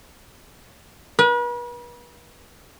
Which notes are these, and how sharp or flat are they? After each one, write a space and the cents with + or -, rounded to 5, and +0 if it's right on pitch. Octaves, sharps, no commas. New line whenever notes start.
B4 -40